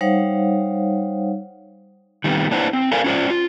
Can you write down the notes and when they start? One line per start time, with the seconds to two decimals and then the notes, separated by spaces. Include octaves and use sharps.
0.01 G3 D#4 C5 C#5 F5 F#5
2.24 D#3 G3 B3 C4
2.51 A#3 D4 E4 B4 C5 F#5
2.73 C4
2.92 A4 A#4 C5 D5 F5 G#5
3.04 C#4 F4 C5 D5
3.30 F4